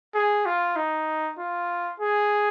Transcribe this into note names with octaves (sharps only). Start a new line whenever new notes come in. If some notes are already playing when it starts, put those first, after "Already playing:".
G#4
F4
D#4
F4
G#4